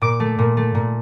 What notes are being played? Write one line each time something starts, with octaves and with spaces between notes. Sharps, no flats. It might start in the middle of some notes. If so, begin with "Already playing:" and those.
A#2 D6
A3
A#2
A3
A#2